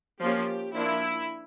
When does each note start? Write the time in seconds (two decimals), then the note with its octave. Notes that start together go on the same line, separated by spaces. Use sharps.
0.20 F3 A#3 C#4 G4
0.74 F3 A#3 D4 E4